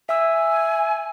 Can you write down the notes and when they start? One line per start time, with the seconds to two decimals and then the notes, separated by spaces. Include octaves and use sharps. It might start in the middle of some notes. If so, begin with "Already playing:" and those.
0.09 E5 G#5 E6